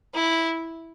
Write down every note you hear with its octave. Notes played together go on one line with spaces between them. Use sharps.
E4